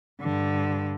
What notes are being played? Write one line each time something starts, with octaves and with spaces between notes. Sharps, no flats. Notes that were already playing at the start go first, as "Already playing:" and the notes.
G2 D3